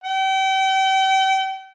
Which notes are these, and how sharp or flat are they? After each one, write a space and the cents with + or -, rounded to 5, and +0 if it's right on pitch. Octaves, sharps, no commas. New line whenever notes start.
G5 -35